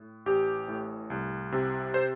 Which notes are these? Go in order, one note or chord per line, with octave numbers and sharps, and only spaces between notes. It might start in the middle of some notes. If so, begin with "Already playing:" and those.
Already playing: A2
A1 G4
A2
C2
C3
C5